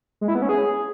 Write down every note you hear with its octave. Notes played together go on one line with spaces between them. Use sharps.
G#3
E4
B3
C#4
G#4